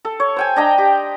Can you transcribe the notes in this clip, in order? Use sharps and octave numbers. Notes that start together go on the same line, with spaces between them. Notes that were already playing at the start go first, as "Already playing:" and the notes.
A4
C#5
C5 G5 G#5
D4 D#5 G5 A#5
G4